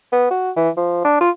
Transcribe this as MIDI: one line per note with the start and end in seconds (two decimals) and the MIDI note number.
0.12 0.29 59
0.31 0.51 66
0.56 0.69 52
0.77 1.04 53
1.05 1.17 62
1.21 1.30 65